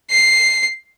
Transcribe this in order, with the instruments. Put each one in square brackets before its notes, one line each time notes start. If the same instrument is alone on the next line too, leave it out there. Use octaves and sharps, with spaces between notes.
[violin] C7